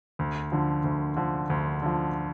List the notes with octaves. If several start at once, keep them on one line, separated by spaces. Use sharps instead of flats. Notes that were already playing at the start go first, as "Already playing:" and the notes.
D2
D3 F3
D2
D3 F3
D2
D3 F3